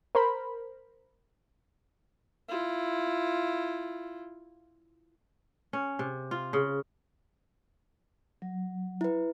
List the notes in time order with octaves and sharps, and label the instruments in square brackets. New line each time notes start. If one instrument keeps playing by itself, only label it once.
[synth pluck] A#4 C5 B5
[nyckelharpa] E4 F4
[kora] C#4
C3
F4
C#3
[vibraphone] F#3
[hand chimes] E4 B4